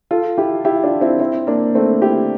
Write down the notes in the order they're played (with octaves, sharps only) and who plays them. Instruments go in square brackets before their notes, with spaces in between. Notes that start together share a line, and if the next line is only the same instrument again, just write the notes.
[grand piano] F4 A4
E4 G4
E4 G4
D4 F4
C4 E4
C4 E4
A#3 D4
A3 C4
E4 G4